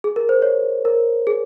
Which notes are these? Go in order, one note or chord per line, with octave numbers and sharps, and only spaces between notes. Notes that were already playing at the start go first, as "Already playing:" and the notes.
G#4
A#4
C5
C#5
A#4
G#4